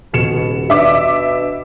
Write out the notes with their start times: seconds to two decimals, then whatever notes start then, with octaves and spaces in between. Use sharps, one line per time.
0.13 D#1 B2 C#7 E7
0.70 B2 D4 E5 D6